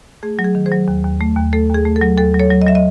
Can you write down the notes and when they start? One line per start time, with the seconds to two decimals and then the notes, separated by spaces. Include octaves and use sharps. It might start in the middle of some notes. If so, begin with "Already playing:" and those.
0.23 A3 G#4
0.39 F#3
0.44 G#4
0.55 D#3
0.66 G#4 C5
0.71 F#3
0.88 D#2
1.04 D#2
1.20 A3
1.36 D#2
1.53 A3 A4
1.69 D#2
1.74 G#4
1.85 A3
1.96 A4
2.01 F#3
2.18 D#2 A4
2.34 F#3
2.39 A4 C#5
2.50 F#3
2.62 D#5
2.67 F#3 E5
2.75 D#5